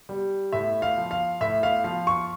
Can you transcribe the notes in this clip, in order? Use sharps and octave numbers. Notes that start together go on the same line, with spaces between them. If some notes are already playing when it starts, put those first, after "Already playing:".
G3
A2 E5
F5
F3
F5
A2 E5
F5
F3 F5
C#6